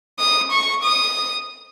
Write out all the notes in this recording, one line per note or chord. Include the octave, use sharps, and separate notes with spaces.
D#6
C#6
D#6